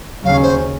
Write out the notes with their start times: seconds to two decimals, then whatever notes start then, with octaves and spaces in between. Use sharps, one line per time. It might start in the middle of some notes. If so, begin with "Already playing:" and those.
0.25 D#2 C#3 F#3 C#4 F5
0.42 C5